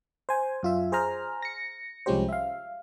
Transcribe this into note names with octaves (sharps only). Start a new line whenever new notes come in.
C5 G#5
F#2 F4 E5
G#4 C5 G#5 A#5 F6
A#6 C#7
C2 F3 G#3 C#4 G4 C5
E5 F5